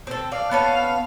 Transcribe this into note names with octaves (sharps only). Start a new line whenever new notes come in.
C4 A4
D5 F5
B3 C#4 A4